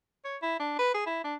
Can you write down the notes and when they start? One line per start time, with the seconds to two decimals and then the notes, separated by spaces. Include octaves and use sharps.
0.25 C#5
0.42 E4
0.60 D4
0.79 B4
0.94 G#4
1.06 E4
1.24 D4